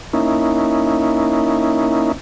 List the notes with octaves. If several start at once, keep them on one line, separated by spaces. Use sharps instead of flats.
A#3 C#4 D#4 E4